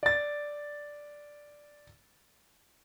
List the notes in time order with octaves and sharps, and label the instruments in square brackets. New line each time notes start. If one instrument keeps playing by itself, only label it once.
[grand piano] D5 A6